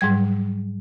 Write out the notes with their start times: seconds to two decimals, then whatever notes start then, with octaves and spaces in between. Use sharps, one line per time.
0.01 G#2 F#3 G3 G#6